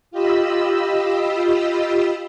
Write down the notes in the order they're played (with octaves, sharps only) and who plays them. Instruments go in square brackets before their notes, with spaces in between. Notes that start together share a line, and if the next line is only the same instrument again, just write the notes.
[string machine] F4 G4 D#5 B5 E6